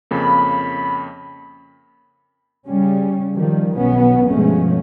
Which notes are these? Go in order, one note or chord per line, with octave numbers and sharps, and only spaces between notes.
F2 C#3 A#3 B5
C#3 G3 C#4
D#3 F3 G3
B1 B2 B3 C#4
G1 B2 F3 G#3 A3 C#4